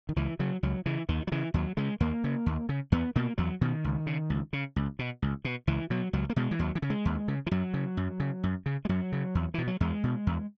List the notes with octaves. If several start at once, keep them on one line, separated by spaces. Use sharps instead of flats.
D#3
C#2 E3
C#3 F#3
C#2 F#3
C#3 E3
D#2 D#3
F#3
C#3 E3
D#2 F#3
C#3 G#3
D#2 A#3
C#3
D#2
C#3
E2 B3
B2 A#3
E2 F#3
B2 D#3
C#2
C#3
C#2
C#3
C#2
B2
C#2
B2
C#2 E3
B2 F#3
C#2 F#3
A#3
B2 G#3
E3
D#2 F#3
E3
C#3
G#3
D#2
C#3
E3
F#2 F#3
C#3
F#2
C#3
F#2
C#3
G#3
F#2 F#3
C#3
E2
B2 E3
F#3
E2 G#3
B2
E2